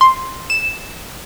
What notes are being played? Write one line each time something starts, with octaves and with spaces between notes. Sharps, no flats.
C6
E7